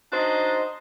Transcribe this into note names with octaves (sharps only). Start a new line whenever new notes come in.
D4 D#4 F#4 C5 D#5